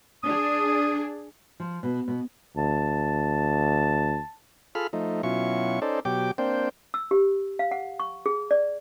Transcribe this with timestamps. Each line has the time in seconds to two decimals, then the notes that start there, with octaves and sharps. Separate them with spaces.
0.23 D4 G#4 D#6
1.60 F3
1.83 B2
2.08 B2
2.57 D2 A5
4.75 F4 G#4 A4 B5 F6
4.93 F3 A3 D#4
5.23 B2 F#3 C#4 E4 F4 C#6
5.82 C#4 D#4 A4 C5 D5
6.05 B2 F#3 G4 G5 D6
6.38 A#3 C4 D4 C5 G5
6.94 E6
7.11 G4
7.59 F5
7.71 F#5
8.00 C#6
8.26 G#4
8.51 D5